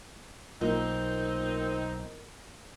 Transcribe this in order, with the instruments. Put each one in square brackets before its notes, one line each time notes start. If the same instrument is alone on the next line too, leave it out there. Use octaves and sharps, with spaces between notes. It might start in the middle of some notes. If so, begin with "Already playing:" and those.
[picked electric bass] B1 [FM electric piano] A#3 F4 A#4 [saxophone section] C4 D#4